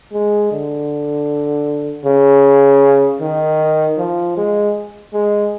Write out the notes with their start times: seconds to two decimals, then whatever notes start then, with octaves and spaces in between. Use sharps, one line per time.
0.13 G#3
0.52 D3
2.05 C#3
3.21 D#3
3.98 F3
4.37 G#3
5.14 G#3